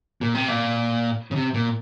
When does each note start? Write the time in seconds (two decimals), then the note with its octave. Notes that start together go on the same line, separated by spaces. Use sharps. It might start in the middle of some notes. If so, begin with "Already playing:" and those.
0.21 A#2
0.35 C3
0.48 A#2
1.31 C#3
1.35 C3
1.54 A#2